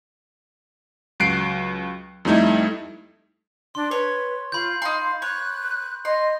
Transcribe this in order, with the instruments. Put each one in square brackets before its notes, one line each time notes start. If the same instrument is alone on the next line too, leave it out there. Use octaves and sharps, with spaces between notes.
[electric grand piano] C#2 F#3 F#6 C7 D7
F2 G3 A3 D#4 E4
[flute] D4 [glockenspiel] C6
[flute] B4 [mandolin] C#5
[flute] F4 [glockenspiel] B5 G6
[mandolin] D#4 C6 [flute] F5
[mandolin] C#5 [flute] F#6
[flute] D#5 [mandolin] C6